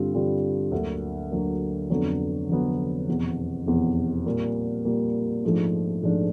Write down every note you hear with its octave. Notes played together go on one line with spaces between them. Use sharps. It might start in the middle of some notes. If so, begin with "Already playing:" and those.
Already playing: G2 D3 G3 C4 F4
G2 D3 G3 C4 F4
D2 D3 F#3 A#3
D2 D3 F#3 A#3
F1 F2 D3 F#3 B3
F1 F2 D3 F#3 B3
F1 E2 B2
F1 E2 B2
A#2 G3 A#3
A#2 G3 A#3
A#1 G#2 F3 A3 D4
A#1 G#2 F3 A3 D4